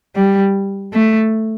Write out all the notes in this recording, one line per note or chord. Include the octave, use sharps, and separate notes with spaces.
G3
A3